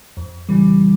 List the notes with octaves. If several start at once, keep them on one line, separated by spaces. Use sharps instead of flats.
F2
C#3 E3 G3